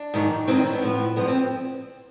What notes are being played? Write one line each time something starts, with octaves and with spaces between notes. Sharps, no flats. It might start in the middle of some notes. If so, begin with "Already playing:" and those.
Already playing: D4
G#2 D#3 F#3
G2 D#3 F#3 C4
D4
C4
B3
A2 F3
G2 D3 F3 B3
C4